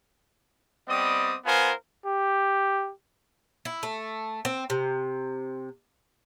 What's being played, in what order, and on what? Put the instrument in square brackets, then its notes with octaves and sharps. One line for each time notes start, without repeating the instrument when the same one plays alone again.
[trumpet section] G3 B3 C4 D5 D#5 D#6
B3 F4 A#4 C5 F5 G#5
[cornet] G4
[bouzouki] E4
A3
C4
C3